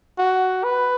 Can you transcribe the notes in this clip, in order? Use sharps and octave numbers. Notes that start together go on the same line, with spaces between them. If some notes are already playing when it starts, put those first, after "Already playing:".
F#4
B4